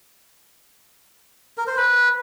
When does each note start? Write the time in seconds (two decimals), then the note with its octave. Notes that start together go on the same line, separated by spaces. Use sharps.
1.58 A#4
1.67 C5
1.77 B4